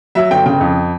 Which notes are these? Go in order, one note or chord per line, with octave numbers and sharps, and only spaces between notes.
F#3 E5
G1 G5
C#3 G5
F2